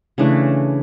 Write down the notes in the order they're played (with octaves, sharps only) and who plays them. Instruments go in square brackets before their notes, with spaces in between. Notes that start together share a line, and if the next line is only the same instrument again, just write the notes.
[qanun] C#3 E3 A3 D4